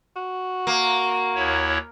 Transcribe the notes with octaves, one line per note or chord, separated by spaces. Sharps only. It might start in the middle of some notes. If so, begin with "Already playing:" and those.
F#4
A#3
D#2 E4 C#5